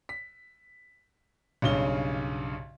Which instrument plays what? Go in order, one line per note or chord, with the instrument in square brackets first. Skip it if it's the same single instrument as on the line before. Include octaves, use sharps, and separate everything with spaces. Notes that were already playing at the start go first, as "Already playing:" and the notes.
[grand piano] B6
B1 G2 C#3 C#4 G7